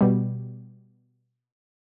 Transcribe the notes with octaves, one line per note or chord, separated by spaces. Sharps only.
B2 G3